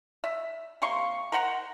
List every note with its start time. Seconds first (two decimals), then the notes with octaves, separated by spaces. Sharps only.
0.24 E5
0.82 C3 A#3 C6 C#6
1.32 A#4 C5 F#5 A#5